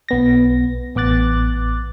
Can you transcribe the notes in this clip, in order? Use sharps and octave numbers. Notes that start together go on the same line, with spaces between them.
B1 B3 A#6
A1 B3 D6 F#6 A6